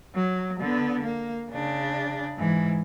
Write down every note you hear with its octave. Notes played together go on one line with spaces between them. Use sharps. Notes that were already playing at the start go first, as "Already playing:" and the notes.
F#3
D3 B3
A#3
C#3 D4
G#2 E3